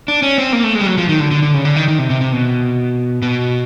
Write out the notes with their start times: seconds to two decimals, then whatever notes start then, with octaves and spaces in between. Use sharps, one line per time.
0.08 D4
0.22 C#4
0.38 C4
0.53 A#3
0.64 A3
0.75 G#3
0.81 G3
0.87 F#3
0.98 F3
1.09 D#3
1.20 D3
1.31 D3
1.43 D3
1.54 C#3
1.65 D3
1.76 D#3
1.88 D#3
1.98 C3
2.10 C3
2.21 C3
2.32 B2
3.22 B2